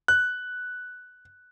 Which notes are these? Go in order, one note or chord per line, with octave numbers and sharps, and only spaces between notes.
F#6